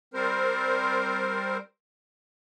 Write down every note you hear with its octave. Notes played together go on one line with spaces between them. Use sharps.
G3 C4 A#4 C5